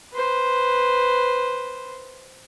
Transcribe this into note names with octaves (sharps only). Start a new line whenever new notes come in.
B4 C5